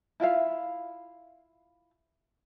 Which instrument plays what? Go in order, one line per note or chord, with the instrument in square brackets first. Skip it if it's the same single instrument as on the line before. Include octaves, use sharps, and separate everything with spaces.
[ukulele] E4 F4 E5 F5